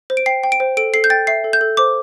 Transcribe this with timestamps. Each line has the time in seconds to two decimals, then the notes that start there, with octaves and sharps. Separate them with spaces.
0.10 C5
0.17 D7
0.26 G5 C7
0.43 G5
0.52 D7
0.60 C5
0.77 A4 D7
0.94 A4 C7
1.04 G6
1.10 G5 A6
1.27 E5 C7
1.44 A4
1.53 G6
1.61 A4
1.77 C5 D6